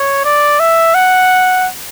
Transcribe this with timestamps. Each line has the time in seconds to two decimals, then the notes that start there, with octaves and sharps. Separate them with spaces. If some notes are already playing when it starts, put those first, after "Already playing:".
Already playing: C#5
0.25 D5
0.60 E5
0.94 F#5